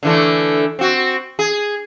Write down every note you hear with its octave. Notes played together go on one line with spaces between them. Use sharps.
D3 E3 A3
C4 F#4
G#4